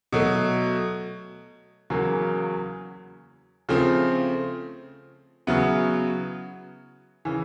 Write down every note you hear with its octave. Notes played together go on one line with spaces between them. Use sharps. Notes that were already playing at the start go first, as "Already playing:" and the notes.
B2 F#3 A3
E2 C#3 F#3 A#3
C#3 F3 A3 C4
C#3 F#3 B3 E4
C#3 E3